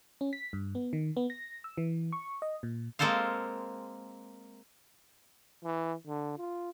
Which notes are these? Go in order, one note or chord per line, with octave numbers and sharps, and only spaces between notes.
C#4
B6
G2
B3
D#3
B3
A#6
E6
E3
C#6
D#5
A#2
G#3 A#3 C4 A4 C5 F5
E3
D3
F4